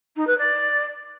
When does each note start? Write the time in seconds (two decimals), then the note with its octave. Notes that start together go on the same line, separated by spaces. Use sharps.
0.16 D#4
0.27 B4
0.38 D5